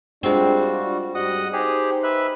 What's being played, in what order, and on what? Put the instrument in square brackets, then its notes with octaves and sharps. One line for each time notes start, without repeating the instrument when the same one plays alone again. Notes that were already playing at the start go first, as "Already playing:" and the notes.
[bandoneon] G3 F#4 [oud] G#3 C4 [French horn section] D4 F4
[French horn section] G#2 G3 F#4 [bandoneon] D#5 F#5 D#6
[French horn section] D#4 C5 [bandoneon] G4 G#4
[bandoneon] B4 E5 F#6